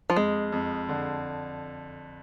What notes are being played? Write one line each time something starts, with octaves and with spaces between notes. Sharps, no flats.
F3
F2 G#3
F2
D3